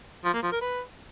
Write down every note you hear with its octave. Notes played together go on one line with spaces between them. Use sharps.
F3
A#3
F3
A#4
B4